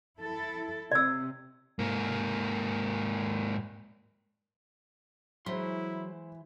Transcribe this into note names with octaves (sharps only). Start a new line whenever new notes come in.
E4 A4
C3 D5 E6
G#2 A#3
E3 F#3 G#3 E4 C5 C6 B6